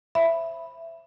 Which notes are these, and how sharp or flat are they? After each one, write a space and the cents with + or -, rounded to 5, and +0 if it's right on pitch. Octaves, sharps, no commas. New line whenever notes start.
C5 +25 E5 +10 B5 +0